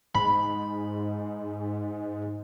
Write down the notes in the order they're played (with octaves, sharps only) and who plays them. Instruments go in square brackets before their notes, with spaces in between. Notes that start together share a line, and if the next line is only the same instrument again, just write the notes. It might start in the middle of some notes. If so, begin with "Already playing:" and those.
[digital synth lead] G#2 [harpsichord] B5